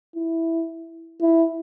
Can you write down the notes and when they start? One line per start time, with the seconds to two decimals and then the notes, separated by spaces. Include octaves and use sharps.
0.16 E4
1.21 E4